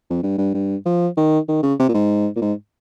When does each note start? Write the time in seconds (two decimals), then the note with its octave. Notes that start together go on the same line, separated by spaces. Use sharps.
0.10 F2
0.23 G2
0.38 G2
0.54 G2
0.86 F3
1.17 D#3
1.48 D#3
1.63 C#3
1.79 C3
1.88 A#2
1.94 G#2
2.36 A#2
2.42 G#2